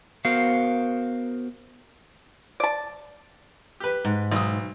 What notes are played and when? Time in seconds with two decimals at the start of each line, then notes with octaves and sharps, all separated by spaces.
0.25 B3 F#4 A#4 C5 F5
2.60 D5 A5
3.80 G4 B4
4.05 G#2
4.32 B1 D#6